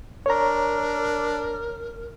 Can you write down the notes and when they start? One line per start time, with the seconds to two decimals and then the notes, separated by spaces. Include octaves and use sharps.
0.26 D4 A#4 C#5 A#5